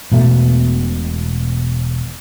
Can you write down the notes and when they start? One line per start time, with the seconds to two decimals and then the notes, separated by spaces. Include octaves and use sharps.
0.12 E1 B2 A3